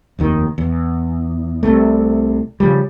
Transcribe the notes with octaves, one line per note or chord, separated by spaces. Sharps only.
F1 D#2 D#3
E2
C2 C3 A3
C#3 F3 G3